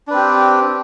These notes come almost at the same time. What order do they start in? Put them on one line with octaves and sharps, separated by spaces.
D4 B4 C4 G4